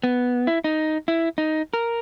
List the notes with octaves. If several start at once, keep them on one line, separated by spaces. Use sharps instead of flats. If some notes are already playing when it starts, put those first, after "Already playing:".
B3
E4
D#4
E4
D#4
A#4